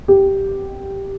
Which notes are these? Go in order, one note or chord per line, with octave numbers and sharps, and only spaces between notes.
G4